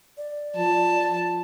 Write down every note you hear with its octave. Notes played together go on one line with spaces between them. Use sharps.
D5
F3 A5